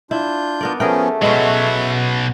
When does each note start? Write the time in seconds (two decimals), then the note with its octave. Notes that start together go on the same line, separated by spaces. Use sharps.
0.11 D4 E4 F4 G6
0.61 B3 A#4 D5
0.80 F3 A3 B3 C#4 G#4 A#4 G5
1.22 B2 F#3 G#3 B3 C#4 E5 F#5